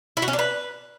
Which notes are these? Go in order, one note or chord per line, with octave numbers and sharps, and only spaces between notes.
E4
F#4
C#4
D4
B4